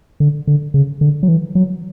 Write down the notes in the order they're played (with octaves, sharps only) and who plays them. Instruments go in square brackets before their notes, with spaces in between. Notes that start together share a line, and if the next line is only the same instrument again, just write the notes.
[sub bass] D3
D3
C#3
D3
F#3
E3
F#3